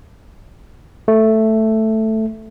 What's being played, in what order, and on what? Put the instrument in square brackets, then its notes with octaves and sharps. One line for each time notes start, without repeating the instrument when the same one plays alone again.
[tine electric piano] A3